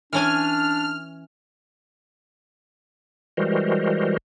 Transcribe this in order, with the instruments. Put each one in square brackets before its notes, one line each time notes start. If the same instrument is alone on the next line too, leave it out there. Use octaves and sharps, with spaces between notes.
[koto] E3 C#4 G#5 [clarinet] D4 [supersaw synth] F6
[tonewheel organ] E3 G3 G#3 F#4 A#4 C5